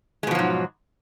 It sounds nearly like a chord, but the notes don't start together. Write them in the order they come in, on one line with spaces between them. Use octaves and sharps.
G#3 B2 F3 F#3 G#2